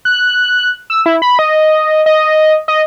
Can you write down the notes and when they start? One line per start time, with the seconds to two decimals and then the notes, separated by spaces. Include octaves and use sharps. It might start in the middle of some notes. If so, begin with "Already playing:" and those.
0.05 F#6
0.90 E6
1.06 E4
1.22 B5
1.39 D#5
2.06 D#5
2.68 D#5